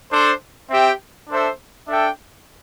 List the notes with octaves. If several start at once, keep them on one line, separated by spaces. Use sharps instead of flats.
D4 A4 C5
C4 G4 E5 G5
D4 A4 C5 E5
D4 A4 E5 G5